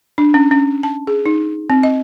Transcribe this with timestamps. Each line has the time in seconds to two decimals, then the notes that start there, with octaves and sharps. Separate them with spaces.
0.18 D4
0.34 C#4
0.51 C#4
0.83 A5
1.07 G#4
1.26 D#4
1.70 C4
1.83 D#5